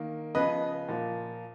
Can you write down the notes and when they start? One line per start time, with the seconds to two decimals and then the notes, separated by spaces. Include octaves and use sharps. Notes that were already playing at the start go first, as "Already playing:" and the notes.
Already playing: D#3 A#3
0.35 C#3 F3 B3 B4 D#5
0.88 A#2 F3 A#3